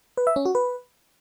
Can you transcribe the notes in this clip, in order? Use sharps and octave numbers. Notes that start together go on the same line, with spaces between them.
B4
E5
C#4
F#4
B4